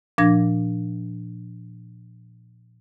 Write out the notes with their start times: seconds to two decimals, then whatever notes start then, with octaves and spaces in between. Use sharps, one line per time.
0.18 A#2 F3 D4 G#6 A#6